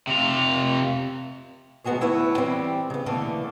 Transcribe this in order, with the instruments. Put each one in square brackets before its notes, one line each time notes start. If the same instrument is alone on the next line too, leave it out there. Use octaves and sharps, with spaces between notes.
[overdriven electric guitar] C3 F4
[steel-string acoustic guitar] D2 G#2 B3 F#4 G#4 C#5
D2 E4 B4 C#5 F#5
E3 G3 C4
C#3 B3
B2 D3 E3 A3 A#3